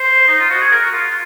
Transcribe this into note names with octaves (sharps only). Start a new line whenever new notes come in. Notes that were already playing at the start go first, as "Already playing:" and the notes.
Already playing: C5
D#4
F4
F#4
G#4
A#4
F#4
F4
F4